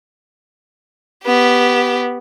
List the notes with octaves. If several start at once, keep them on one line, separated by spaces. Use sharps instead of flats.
B3 G4